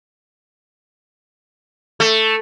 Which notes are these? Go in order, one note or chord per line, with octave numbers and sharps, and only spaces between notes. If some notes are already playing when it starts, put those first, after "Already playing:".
A3